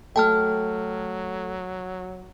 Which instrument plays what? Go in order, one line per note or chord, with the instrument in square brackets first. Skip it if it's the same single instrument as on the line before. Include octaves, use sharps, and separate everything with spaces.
[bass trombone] F#3 [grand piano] A3 [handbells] G5 A5 F6